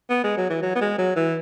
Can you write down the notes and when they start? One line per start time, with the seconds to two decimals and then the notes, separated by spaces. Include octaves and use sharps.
0.10 B3
0.24 G#3
0.37 F#3
0.50 E3
0.63 F#3
0.76 B3
0.81 G#3
0.98 F#3
1.16 E3